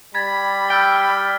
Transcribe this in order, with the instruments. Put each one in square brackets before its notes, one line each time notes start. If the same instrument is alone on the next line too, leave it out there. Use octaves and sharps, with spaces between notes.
[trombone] G3 [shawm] B5 [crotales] G#6 A6
[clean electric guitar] G5 [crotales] E6 F6 A6
[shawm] B5